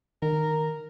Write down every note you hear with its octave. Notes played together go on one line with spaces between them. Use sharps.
D#3 A#4